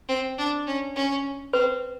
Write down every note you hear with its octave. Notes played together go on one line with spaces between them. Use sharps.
C4
D4
C#4
C#4
C4 B4